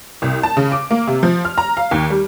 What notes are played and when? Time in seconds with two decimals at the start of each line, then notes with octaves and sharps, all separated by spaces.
0.22 C2
0.43 A5
0.57 C#3
0.72 D6
0.91 A#3
1.07 C3
1.23 F3
1.45 F6
1.58 A#5
1.77 F5
1.91 D#2
2.10 G3